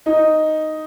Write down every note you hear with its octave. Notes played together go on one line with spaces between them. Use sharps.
D#4